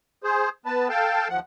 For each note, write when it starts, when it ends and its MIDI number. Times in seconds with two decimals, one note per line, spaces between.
0.24 0.49 68
0.24 0.49 72
0.66 0.88 59
0.66 0.88 71
0.66 0.88 81
0.89 1.28 69
0.89 1.28 77
0.89 1.28 79
0.89 1.28 81
1.29 1.40 39
1.29 1.40 53
1.29 1.40 78